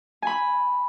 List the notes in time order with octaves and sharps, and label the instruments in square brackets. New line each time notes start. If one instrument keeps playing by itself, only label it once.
[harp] G#5 B5